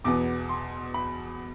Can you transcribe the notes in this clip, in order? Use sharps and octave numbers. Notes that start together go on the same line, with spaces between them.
E2 B2 B3 D6
C6
B5